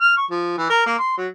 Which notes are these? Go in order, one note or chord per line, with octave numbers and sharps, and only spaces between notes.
F6
C#6
F3
E3
A#4
A#3
C6
F#3